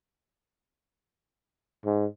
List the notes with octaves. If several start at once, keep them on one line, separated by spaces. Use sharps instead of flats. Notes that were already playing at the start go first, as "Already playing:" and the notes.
G#2